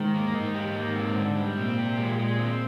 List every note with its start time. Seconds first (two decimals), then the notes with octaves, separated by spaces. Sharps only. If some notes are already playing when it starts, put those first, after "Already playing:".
Already playing: G#2 D#3
0.14 A#3
0.34 G#2 D#4
0.54 G4
0.75 A#3
0.95 C4
1.16 D3
1.37 G3
1.57 A#2 C4
1.78 G4
1.98 G#3
2.18 G#3
2.38 C4